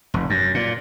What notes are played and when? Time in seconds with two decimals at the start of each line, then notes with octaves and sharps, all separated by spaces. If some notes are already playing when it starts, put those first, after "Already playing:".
0.14 F1
0.30 F#2
0.54 A#2